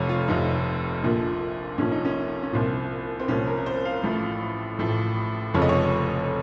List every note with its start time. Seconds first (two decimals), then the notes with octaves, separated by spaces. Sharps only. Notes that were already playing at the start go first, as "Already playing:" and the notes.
Already playing: F1 F2 C3 C#5 F5
0.09 F4
0.28 F1 F2 C3 D#4
1.03 A#1 A#2 F3
1.78 A#1 A#2 F3 C#4
1.92 D#4
2.05 C#4
2.43 C#4
2.53 C2 A#2 F3 C4
3.20 C4
3.28 C2 A#2 F3 C#4
3.47 A#4
3.66 C5
3.85 F5
4.03 A1 A2 F3
4.79 A1 A2 F3
5.54 F1 F2 C#3 F3 C#5
5.61 D#5
5.69 C#5